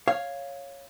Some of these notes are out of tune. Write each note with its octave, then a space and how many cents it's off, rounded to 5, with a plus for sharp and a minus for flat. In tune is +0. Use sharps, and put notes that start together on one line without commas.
C#5 +0 F5 +0